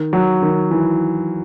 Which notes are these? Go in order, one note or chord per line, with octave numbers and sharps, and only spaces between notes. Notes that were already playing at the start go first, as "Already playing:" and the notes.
Already playing: D#3
F#3
D#3
E3